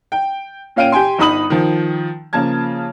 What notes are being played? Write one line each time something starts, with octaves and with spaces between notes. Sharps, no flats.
G5
A#2 C#4 F5 G5 D7 D#7
G4 G5 G#5 C6
G1 D#4 B5 D#6 F#7
D#3 F3
C#3 F3 A#3 A5 G#6